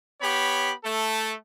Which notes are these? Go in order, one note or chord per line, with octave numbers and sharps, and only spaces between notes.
B3 G4 C#5 B5
A3 A4